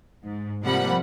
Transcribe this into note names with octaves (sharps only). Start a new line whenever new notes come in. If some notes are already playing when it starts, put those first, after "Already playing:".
G#2
C3 F3 G3 A#3 F#5 B5